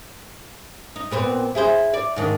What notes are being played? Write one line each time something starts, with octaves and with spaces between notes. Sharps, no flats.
D#4
A#2 B3 C4
E4 G#4 C5
D5
G#2 D#3 D4